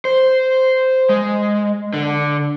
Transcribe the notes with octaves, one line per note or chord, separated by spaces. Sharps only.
C5
G#3
D3